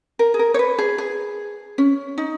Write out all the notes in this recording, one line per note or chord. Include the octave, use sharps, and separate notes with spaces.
A#4
G#4
A#4
C#5
B4
G#4
G#4
C#4
D#4